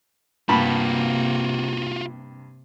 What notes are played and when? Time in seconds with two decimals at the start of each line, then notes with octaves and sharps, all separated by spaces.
0.49 G2 C3 A#3 F4 F#4 A5 B5